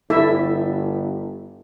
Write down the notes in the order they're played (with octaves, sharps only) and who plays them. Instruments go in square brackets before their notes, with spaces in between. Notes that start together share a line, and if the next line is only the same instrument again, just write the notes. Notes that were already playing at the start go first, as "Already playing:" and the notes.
[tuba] G1 [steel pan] E4 A4 E5